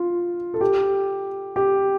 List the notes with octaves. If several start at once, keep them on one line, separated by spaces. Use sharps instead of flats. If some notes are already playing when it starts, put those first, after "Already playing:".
Already playing: F4
A4
G4
G4